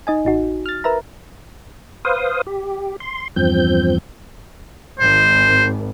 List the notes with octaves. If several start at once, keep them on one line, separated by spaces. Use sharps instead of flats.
D#4 D#5 G#5
A1 D#4 F#4
F6 A6
A#4 B4 E5 A#5
B4 C5 F5 D#6
G4
C6
E2 G2 F3 C4 G6
G#1 C5